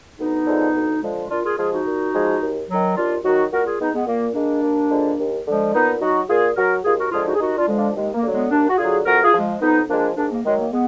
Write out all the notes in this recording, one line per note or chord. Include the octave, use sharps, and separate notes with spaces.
D2 B3 D#4
D3 F3 G#3
D2
D3 F3 G#3
A#2 D4 F4
F4 G#4
F3 G#3 F4 G#4
D#4 F#4
A#2
F3 G#3
D#2
D#3 F#3
D#2 D4 F4
D#3 F#3 D#4 F#4
A#2 F#4 A#4
F4 G#4
G#3 B3 D#4
G#3 B3
A#2 A#3
G#3 A#3 D4
D#2
D3 F3 G#3
D#2
D3 F3 G#3
A#2 B3 D#4
F#3 D#4 F#4
A#2 F4 G#4
F#3 F#4 A#4
D#2 F4 G#4
F#4 A#4
D3 F3 G#3 F4 G#4
D#4 F#4
G#4
D#2 D#4 F#4
D4 F4
D3 F3 G#3
D4 F4
D#2 G#3
A#3
D3 F#3
G#3 B3
D#2 A#3 D4
F#4
D3 F#3 F4 G#4
F2 F#4 A#4
F4 G#4
F3
G#3
F2 B3 D#4
F3 G#3 A#3 D4
G#2 A#3 D4
A#3
D#3 F#3 G#3
A#3
G#3 B3